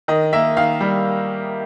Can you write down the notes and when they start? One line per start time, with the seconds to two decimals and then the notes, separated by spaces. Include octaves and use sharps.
0.08 D#3 D#5
0.33 A#3 E5
0.57 D#3 F5
0.81 G3